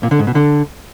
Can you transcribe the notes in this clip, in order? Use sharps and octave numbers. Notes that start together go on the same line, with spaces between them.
A#2
D3
G#2
B2
D3